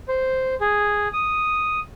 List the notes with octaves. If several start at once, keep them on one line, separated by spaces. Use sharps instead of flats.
C5
G#4
D#6